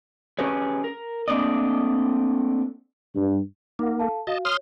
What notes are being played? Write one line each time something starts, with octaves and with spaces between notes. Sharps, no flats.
C#4 G4 G#4 B4 C#5
A#4
A3 A#3 C4 D4 D5 D#5
G2
A#3 D#4 F#5
A4 F5 A5
F#4 D#5 F5 A5
C#5 C6 D#6 F6